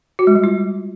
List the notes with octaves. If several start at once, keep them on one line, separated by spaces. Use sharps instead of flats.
F#4
G#3
G3
F4